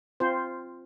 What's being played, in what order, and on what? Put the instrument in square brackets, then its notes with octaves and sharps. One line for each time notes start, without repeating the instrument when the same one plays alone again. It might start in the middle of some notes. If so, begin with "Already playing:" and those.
[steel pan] C4 F4 C5